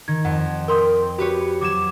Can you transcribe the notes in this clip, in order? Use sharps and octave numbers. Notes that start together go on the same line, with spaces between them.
D#3 G#6
F2 F#5
A#4 G5 C6 D#6
F#4 G4 B4 C#5
F#3 D6 G#6 E7